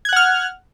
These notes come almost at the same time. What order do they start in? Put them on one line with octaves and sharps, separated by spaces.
G#6 F#6 F#5 F6